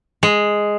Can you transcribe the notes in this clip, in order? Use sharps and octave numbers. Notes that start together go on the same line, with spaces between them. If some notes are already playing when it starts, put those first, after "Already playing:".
G#3